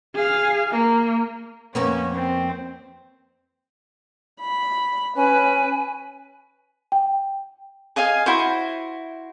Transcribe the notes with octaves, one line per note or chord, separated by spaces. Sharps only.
G#4 F5
A#3
F2 A#3 B3 C#4
C4
B5
C#4 B4 G#5
G5
G#4 D#5 F5 G#5
E4 F#4 C5